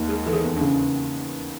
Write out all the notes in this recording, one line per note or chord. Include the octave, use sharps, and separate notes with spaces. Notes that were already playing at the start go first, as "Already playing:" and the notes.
Already playing: D#2
G#3 G#4
E3 A4
G#4
E2
C#3 D4